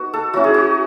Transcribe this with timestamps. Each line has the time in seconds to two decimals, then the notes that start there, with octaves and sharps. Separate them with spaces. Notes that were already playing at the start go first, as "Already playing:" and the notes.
Already playing: B3 D#4 F#4
0.13 A4
0.34 F#3 C#4 E4 F#4
0.44 G#4
0.54 F#4